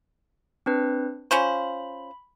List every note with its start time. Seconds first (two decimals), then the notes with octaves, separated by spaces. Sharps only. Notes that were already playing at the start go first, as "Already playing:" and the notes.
0.66 C4 D4 B4
1.31 C#4 F4 C5 B5